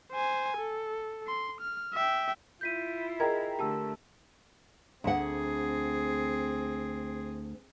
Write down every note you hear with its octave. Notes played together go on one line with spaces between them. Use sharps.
C5 G#5
A4
C6
F6
E5 G5
E4 F4 G6 B6 D#7
G#4 A#4 D#5 G5 A#5 G#6
D3 A3 G4 A5 E6
D2 C4 G#4 F#5